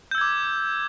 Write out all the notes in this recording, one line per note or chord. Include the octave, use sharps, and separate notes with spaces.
D6 E6 G6 G#6